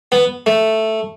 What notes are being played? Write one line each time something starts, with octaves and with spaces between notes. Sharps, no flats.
B3
A3